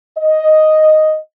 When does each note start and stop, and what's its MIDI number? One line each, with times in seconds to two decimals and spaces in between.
0.18 1.17 75